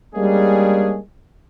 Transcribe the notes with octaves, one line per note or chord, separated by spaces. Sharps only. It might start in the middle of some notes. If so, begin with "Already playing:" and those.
G3 G#3 A#3 C#4 D4 G#4